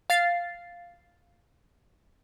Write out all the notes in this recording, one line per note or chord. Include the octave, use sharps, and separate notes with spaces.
F5 A6 C7